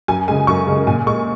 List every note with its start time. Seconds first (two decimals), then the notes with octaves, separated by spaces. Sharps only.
0.08 F#2 G#5
0.28 C#3 G#3 G#5
0.47 F#2 C#6
0.67 C#3 G#3
0.87 A#2 G#5
1.06 G#3 C#6